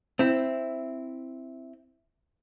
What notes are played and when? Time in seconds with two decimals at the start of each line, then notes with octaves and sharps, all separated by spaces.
0.19 C4 E4